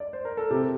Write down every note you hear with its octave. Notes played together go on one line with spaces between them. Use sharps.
D5
C5
A#4
A4
C3 G4